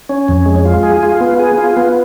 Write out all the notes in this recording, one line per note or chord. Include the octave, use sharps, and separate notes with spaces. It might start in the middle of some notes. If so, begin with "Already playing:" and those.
C#4
F2
G#3
F4
G#4
F4
B3
G#4
F4
B3